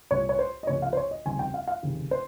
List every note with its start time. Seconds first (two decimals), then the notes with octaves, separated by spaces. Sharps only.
0.11 C2 A#2 G3 C#4 C#5
0.29 C#5
0.39 C5
0.63 D#5
0.67 C#2 C3 F3 A#3 C#4 C#5
0.82 F5
0.93 C5
0.97 C#5
1.11 D#5
1.25 F1 D#2 C#3 G3 C4 G#5
1.39 G5
1.54 F5
1.67 F5
1.83 F1 D#2 C#3
2.11 C5